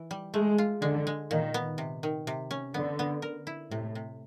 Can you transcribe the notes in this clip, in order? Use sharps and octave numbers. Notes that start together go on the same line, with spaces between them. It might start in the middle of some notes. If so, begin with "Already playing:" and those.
Already playing: E3
G3
G#3 A3
F4
D3 G#3
G#3
A#2 D#3
B3
C3
D#3
C3
C#4
D3 B3
B3
A#4
E4
A2 C3
C3